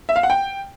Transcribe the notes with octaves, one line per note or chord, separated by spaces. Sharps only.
E5
F5
F#5
G5